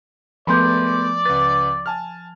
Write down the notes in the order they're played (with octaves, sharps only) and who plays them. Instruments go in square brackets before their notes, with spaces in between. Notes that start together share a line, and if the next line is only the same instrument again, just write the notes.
[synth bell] F3 [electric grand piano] G#3 A3 B3 [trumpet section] D5 [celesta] B5 C6 G6
[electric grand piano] C#2 B4 [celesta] A6
[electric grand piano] G#5 A5 F6